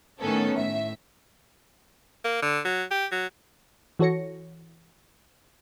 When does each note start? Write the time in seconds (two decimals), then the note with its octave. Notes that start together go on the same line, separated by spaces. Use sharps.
0.20 A2 D#3 B3 C#4 A4
0.55 A2 E5
2.25 A#3
2.42 D3
2.65 F#3
2.91 G4
3.11 F#3
3.99 E3 F#4 A4 C#5 A#6 C#7